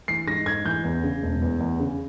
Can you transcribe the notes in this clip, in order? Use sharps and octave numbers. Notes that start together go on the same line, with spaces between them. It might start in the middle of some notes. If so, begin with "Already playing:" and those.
E3 C7
G#2 A#6
G#2 G#6
E3 G6
E2
C#3
E1
E2
E2
C#3